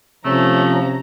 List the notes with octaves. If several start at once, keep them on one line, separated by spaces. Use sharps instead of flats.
C3 F3 A3 C#4 A#5